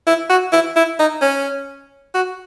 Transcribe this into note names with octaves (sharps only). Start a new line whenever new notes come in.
E4
F#4
E4
E4
D#4
C#4
F#4